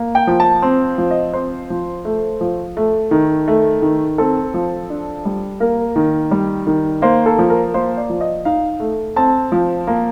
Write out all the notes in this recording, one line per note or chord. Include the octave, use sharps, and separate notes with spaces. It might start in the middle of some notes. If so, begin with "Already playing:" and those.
Already playing: A#3
G5
F3
A5
C4
F3
D#5
C4 C5
F3
A3
F3
A3
D#3
A3
D#3
C4 A4
F3
D4
G3
A#3 A#4
D#3
G3
D#3
A#3 C5
A4
F3
A#4
A#3 C5
D5
F3
D#5
D#4 F5
A3
C4 A5
F3
A#3